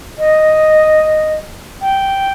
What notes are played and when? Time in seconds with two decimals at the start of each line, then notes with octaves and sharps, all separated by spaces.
0.18 D#5
1.81 G5